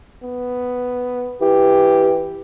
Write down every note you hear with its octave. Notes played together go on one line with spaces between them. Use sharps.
B3
E3 G4